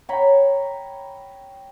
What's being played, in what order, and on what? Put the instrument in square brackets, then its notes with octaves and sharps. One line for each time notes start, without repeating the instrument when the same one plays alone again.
[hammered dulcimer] C#5 G5 A#5 B5